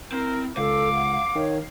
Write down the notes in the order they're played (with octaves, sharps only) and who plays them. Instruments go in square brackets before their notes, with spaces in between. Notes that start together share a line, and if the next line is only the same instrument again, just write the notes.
[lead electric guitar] C4 [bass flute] E4 [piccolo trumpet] A#4
[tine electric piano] C#2 [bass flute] A4 [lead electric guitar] F5 [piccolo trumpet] D6
[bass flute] F#5
[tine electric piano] D#3 [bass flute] C#5